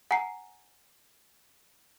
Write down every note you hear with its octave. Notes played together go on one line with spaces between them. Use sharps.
F#5 G#5 A#5 C7